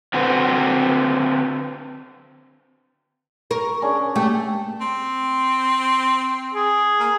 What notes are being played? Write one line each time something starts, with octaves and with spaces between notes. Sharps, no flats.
D3 C4 F#4 B4
A#4 C#6
C#4 D4 G#4
A3 G4 A5
C4
G#4
A#3